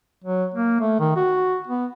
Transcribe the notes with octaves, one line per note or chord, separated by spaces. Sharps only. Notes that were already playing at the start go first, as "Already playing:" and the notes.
F#3
A#3
A3
D#3
F#4
B3